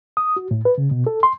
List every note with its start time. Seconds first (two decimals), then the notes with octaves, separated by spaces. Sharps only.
0.17 D#6
0.36 F#4
0.51 A2
0.65 B4
0.78 C#3
0.91 B2
1.07 A4
1.23 C6